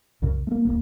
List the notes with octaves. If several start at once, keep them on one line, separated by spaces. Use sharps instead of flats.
C2 F#2 C#3
A3 A#3
D1 F2 A#3